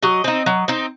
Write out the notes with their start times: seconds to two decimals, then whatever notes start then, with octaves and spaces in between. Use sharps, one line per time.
0.02 F#3 D#5
0.24 C4 D#4
0.46 F#3
0.68 C4 D#4